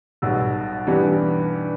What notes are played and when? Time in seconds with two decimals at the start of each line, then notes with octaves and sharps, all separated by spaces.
0.22 B1 B2 G3
0.87 G2 E3 B3 D4 G4